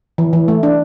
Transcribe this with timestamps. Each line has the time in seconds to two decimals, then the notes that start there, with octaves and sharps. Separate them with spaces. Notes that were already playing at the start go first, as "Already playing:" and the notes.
0.18 E3
0.33 E3
0.48 A3
0.63 D4